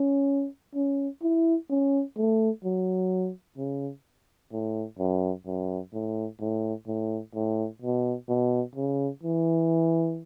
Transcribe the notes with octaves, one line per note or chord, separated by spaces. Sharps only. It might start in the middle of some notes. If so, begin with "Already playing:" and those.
Already playing: C#4
C#4
E4
C#4
A3
F#3
C#3
A2
F#2
F#2
A2
A2
A2
A2
B2
B2
C#3
E3